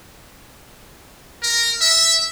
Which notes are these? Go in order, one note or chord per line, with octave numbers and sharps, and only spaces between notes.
A#4
E5